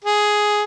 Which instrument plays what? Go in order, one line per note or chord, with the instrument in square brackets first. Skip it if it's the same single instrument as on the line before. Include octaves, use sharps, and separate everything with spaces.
[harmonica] G#4